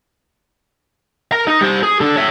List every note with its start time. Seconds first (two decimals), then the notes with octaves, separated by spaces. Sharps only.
1.32 A#4 A#5
1.47 D#4 D#5
1.61 G3 C5
1.83 G#4
2.01 D4 A4
2.16 C#5 E5